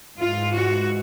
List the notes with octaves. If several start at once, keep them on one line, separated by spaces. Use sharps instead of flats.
G#2 E3 F4
F#4